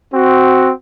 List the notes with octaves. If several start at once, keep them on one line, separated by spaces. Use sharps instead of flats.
C4 F#4